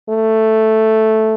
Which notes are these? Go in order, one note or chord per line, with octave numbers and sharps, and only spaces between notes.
A3